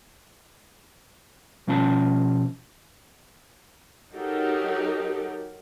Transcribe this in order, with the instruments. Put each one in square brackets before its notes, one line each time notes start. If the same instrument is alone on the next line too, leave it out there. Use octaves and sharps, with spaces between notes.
[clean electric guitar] B2 F3 C#4 F4 A5 B5
[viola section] F#3 D#4 F#4 G4 A4 A#4